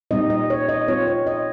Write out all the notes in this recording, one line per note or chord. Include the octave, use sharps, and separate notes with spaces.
A#2 G3 C4 D#4 D#5
D#5
C#5
D#5
G3 C4 F4 C#5
C#5
D#5